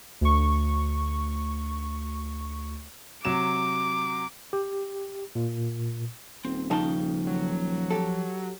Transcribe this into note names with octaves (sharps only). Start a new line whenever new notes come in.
D2 C#6
C3 F#3 D6 E7
G4
A#2
D#1 C4
C#3 F3 D#4 G5 A5
F#3
G4 A4